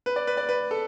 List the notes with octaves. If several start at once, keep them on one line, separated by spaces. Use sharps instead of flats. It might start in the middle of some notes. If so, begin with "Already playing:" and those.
B4
D5
B4
D5
B4
A4